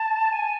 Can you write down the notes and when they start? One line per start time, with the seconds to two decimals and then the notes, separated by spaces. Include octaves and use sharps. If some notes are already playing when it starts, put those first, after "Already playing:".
Already playing: A5
0.32 G#5